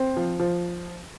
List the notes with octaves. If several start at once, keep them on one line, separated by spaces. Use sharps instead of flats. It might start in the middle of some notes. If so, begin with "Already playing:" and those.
Already playing: C4
F3
F3